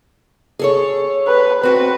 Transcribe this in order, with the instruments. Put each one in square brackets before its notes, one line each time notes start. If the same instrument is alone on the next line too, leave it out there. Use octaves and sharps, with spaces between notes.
[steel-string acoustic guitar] G#4 A4 C#5
[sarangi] B4
[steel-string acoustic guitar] C4 F#4 [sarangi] B4